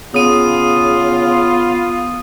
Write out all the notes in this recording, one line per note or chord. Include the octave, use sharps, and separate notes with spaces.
C#3 B3 F4 D#6 D#7